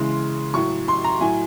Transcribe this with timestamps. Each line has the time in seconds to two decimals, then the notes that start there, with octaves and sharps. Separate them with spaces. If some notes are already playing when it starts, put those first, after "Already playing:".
Already playing: C#3 E3 G#3 C6
0.54 A2 F#3 C#6
0.88 C6
1.04 A#5
1.21 A2 F#3 G#5